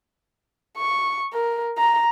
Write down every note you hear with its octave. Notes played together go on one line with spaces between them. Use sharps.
C#6
A#4
A#5